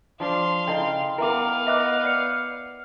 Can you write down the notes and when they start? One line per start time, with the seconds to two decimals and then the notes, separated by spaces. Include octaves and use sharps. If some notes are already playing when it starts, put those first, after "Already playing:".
0.20 F3 D4 F5 C6
0.67 C#3 E4 A4 D#5 G5
1.18 B3 E4 A#4 E5 F5 D6
1.67 B4 D#5 E5 F#5 D6 F#6
2.04 D5 F#5 F6 C7 C#7